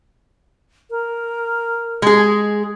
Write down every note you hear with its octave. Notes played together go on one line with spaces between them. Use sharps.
A#4
G#3 G#4